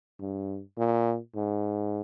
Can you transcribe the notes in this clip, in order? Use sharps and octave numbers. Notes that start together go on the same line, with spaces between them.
G2
A#2
G#2